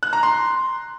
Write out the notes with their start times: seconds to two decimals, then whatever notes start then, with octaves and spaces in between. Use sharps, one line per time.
0.03 F#6
0.13 A#5
0.23 C6